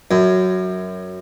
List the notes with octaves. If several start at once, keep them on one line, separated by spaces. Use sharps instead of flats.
F#2